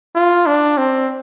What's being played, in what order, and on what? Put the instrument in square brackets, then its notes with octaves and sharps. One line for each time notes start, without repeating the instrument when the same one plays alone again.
[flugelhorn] F4
D4
C4